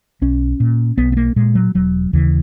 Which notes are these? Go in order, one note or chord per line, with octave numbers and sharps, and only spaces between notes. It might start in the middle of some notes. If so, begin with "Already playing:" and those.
B1 C#4
A#2
B1 B3
B3
A#3
A#2 G#3
F#3
E1 F#3
D#2 C#3 E3